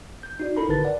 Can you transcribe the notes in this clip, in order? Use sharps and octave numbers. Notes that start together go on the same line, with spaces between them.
G6
D#4 F#4 D5
D#4 E4 A4 A#4 A#5 B5
G#1 D3 A#4 B4 A5 A6
D5 F#5